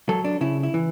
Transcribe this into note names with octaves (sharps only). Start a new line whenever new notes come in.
F#3 A4
D4
C#3 E4
E4
E3